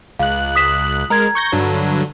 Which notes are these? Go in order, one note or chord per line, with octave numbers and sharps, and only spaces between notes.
C#2 F5 F#6
D#6 B6 E7
G#3 A#4 A#5 G#6
C#6 G6 A#6
G2 D3 F#3